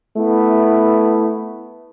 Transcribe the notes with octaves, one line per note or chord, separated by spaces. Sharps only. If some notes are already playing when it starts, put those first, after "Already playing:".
A3 B3 E4